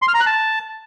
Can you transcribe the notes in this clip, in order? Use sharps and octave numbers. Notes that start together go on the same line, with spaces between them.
C6
F6
A#5
F#6
A5